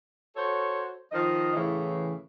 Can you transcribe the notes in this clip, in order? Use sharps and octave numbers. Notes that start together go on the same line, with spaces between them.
F#4 A4 C5 C#5
D#3 F3 D#5
A2 C#3 E3